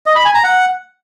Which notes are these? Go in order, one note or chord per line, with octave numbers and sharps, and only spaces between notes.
D#5
B5
G#5
A#5
F#5